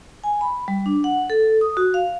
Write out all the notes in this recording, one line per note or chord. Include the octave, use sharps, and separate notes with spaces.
G#5
B5
G3
D4
F#5
A4
D#6
F#4
F5